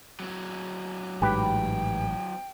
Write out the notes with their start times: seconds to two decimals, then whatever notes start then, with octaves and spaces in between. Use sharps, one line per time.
0.20 F#3 C4
1.22 A1 G#2 G4 B4 G5